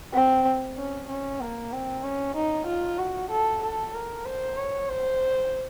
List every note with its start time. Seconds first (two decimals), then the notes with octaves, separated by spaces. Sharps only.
0.14 C4
0.77 C#4
1.09 C#4
1.40 A#3
1.72 C4
2.03 C#4
2.36 D#4
2.66 F4
2.98 F#4
3.31 A4
3.62 A4
3.94 A#4
4.25 C5
4.57 C#5
4.89 C5